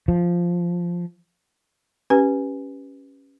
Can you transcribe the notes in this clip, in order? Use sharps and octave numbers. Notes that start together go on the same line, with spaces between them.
F3
C#4 G4 B4 G#5